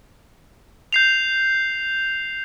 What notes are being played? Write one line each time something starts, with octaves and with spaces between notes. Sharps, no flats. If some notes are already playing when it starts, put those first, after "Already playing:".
G6 C7 F7